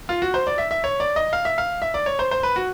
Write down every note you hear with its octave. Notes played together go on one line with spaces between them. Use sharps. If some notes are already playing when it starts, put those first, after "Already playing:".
F4
F#4
C5
D5
E5
E5
C#5
D5
D#5
F5
E5
F5
E5
D5
C#5
C5
C5
B4
F#4